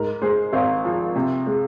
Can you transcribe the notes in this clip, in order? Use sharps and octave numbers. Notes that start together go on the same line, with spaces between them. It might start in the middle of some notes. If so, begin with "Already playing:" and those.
Already playing: G#2 A#4
G#3 G#4 C5
G#1 C5 F5
F3
C3
G#3